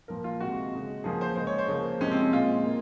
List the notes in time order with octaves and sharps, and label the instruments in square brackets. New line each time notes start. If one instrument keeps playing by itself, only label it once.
[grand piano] A#2 F3 A#3 A#4
F4
C3 D#3 G#3 F#4
C#3 G#3
C#3 F3 A#3 G#4
C5
C#3 G#3 C5
C#5
C5
C#3 F3 A#3
C3 F3 G#3 C#4
C4
C#4
A#2 G#3 F4
A#3